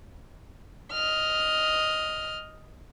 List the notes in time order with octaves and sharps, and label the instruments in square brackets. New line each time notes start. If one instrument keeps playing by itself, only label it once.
[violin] D#5 F6